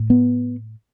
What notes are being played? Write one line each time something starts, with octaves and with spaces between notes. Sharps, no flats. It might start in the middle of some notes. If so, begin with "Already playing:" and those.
Already playing: A2
B3